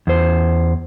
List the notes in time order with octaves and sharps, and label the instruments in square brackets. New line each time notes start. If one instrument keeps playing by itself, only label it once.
[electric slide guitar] E2 C5